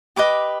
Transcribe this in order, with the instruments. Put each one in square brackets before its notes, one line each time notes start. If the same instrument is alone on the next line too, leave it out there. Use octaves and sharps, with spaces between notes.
[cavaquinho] G4 B4 D#5 D6